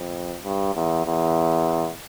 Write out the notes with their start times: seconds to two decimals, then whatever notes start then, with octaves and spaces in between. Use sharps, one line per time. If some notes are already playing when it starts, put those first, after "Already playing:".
Already playing: F2
0.44 G2
0.75 E2
1.06 E2